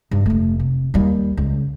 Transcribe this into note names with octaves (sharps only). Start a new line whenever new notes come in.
G2
F1 A3
C3
D#2 G3
C#2